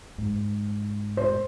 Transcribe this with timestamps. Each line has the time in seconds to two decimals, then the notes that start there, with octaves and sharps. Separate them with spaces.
0.18 G#2
1.17 C5